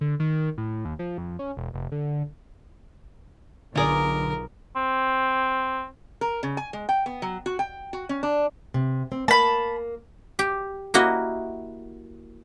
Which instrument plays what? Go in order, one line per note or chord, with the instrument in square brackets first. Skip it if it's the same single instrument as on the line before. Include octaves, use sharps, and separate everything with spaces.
[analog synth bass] D3
D#3
A2
D#2
F3
F2
C#4
E1
F1
D3
[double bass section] B1 [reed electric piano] D3 [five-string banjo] F4 G#4 D5 [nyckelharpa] A#4
[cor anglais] C4
[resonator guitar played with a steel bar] A#4
C#3
G#5
G#3
G5
B3
F#3
F#4
G5
F#4
C#4
D4
[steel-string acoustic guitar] C3
C4
[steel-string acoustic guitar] A#3 [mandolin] A5 B5
[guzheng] G4
A#3 E4 F#4 D#5